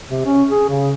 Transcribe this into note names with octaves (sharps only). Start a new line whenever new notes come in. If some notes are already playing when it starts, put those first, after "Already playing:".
C3
C#4
G#4
C#3